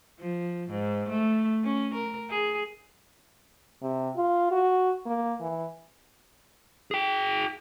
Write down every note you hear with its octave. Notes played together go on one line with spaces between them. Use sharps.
F3
G#2
A3
C#4
A#4
G#4
C3
F4
F#4
A#3
E3
G#4 G5